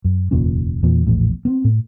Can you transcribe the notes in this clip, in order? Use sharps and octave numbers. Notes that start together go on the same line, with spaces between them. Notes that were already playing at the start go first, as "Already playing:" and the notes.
F#2
F1 D#2 A#2 C#4
E2 A#2
A#1 E2 A2
B3 C4
A2